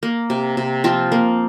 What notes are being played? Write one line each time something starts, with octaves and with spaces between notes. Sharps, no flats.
A#3
C3
C3
F3 C4 F4
A#3